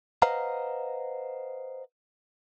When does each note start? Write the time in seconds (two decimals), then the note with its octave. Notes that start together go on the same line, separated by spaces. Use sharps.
0.22 B4 C5 D#5 F5 F#5 A#5